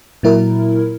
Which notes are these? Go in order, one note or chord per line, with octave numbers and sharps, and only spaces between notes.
A#2 F#3 E4 A#4